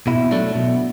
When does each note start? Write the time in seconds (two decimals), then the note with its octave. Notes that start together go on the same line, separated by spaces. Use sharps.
0.07 B2 E4
0.31 F#3 A3 D4
0.56 B2